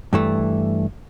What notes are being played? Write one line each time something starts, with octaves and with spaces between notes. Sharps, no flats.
G2 E3 A3